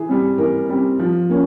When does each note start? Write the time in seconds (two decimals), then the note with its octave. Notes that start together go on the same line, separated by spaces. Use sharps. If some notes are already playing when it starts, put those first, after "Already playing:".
Already playing: E3 G#4
0.09 G3 C4
0.38 E3 A#4
0.69 G3 C4
0.99 F3
1.29 A#3 C#4